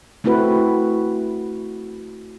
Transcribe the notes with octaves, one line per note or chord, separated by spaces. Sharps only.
A3 C4 E4 F#4 B4